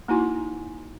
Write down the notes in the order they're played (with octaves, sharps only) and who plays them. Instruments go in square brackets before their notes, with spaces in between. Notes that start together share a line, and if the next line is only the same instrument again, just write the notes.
[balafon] A#3 D#4 E4 F#4 G#5 C6